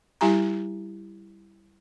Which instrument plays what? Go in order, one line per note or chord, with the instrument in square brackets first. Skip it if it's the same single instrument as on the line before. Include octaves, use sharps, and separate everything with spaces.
[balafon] G3 E4 G4 G#5 A#5